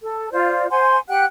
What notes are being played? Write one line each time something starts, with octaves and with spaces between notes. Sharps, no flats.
A4
F4 C5 D5
C5 F#5 G#5 C6
G4 F#5 G5 F#6